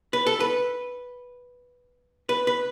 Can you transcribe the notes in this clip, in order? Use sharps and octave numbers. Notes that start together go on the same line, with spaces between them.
B4
A4
B4
B4
B4